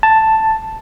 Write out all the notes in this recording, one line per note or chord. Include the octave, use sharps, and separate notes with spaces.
A5